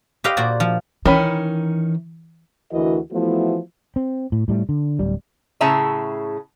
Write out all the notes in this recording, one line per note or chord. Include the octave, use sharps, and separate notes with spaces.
G4 B4 C5 D#5 F5 G5
A#2 F#4 C5 D5
F3
D#3 E3 C#4 B5
D2 E3 E4 F#4 A#4 D#5
E3 F3 A3 B3 E4 F#4
C4
A2
A2 G3 A3
D3
D1 G3
A2 C#3 G#4 E5 A5 A#5